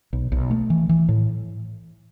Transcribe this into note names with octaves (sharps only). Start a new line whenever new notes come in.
B1
B1
A3
E3
E3
A2